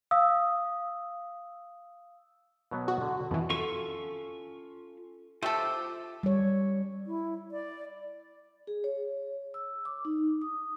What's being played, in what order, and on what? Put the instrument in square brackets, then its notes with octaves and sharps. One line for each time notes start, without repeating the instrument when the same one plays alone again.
[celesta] F5 D#6 E6
[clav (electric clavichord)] B2 F#3 B3
[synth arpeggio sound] F#4
[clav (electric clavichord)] D3
[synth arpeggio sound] F2 E3 [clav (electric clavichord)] B2
[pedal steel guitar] C#4 F4 C#6 [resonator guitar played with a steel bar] A4
[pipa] A3 A4 [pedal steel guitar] F4 C5 E6 [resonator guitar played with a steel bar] G4
[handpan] G3 C#5
[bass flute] E4
D5
[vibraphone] G#4
C#5
E6
D6
D#4
D#6